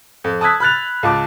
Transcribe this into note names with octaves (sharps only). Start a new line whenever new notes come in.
F2
A5 D#6 E6 F#6 G#6 B6
B5 F6 F#6 A6 F7
C#2 F4 A5 D6